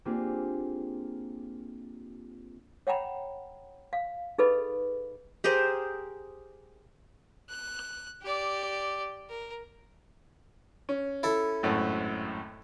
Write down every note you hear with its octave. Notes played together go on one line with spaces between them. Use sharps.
A#3 C4 D4 F4 G4 G#4
C#5 F#5 G5 A#5 B5
F5
D#4 G#4 A4 B4 D#5 B5
G4 G#4 A#4 C5
F#6
G4 D5
A#4
C#4
E4 A4
G#1 F#2 A2